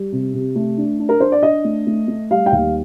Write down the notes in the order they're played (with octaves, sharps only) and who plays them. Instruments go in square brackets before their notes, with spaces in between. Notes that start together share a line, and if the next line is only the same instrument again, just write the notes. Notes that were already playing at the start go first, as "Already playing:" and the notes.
Already playing: [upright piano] G3
C3
C3
A3
D4
D4
A#4
D4 C5
D5
D4 D#5
A3
A3
A3
G3 F5
G5
D#2 F5